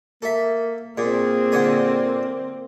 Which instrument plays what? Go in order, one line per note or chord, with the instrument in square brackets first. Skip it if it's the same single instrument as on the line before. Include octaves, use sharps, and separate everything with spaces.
[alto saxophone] A#3 [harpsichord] A4 E5
[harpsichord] A#2 [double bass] A#3 C4 [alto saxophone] G#4
[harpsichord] A#2 D3 G#5